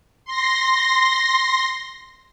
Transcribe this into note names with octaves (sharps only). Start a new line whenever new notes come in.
C6 A#6